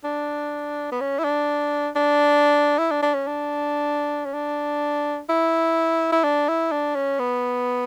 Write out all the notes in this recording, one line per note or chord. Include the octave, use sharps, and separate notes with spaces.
D4
B3
C#4
E4
D4
D4
E4
D4
D4
C#4
D4
C#4
D4
E4
E4
D4
E4
D4
C#4
B3